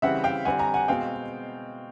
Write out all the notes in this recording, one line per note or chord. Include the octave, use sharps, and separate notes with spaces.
C#3 E3 G3 C4 E5 F#5
F5 G5
D3 G3 C4 F#5 G#5
G#5 A#5
F#5 G#5
B2 G#3 C4 F5 G5